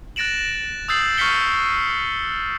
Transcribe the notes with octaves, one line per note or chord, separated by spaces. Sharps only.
F#6 A6 A#6 D7 E7 F#7
D#6 E6 G6 A6 C7 F#7
C#6 F6 G6 B6 C#7 G7